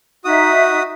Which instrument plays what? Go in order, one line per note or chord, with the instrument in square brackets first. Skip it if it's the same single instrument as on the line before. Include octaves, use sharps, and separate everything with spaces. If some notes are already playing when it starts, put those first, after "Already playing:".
[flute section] D#4 E5 [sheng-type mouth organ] F#4 D#6